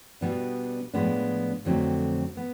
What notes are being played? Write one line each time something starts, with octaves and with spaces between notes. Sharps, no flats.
B2 G3 B3 D4
A2 F3 G#3 B3 D4
F2 D3 F#3 A3 C4
B3